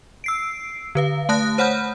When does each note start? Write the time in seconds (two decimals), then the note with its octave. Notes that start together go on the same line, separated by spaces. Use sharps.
0.24 E6 C7 D7
0.95 D3 B4 F5
1.29 A3 A5 D#6 F#6 A#6
1.58 C5 C#5 F#5 B5 F6 G6